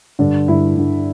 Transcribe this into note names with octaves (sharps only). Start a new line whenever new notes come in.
G2 D3 D4
G2 D3 E4
G2 D3